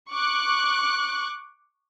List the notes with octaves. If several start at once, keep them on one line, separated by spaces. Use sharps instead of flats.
C#6 D6 F#6